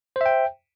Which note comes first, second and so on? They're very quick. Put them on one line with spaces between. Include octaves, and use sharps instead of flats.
C5 E5 G5